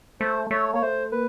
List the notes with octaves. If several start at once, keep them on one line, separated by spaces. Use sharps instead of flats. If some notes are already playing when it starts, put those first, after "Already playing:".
A3 C5
A3 C#5
A#3 C#5
A3 C5
A#3 B4